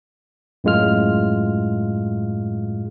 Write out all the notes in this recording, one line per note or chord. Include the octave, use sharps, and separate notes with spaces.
F#2 A2 G#3 F4 F6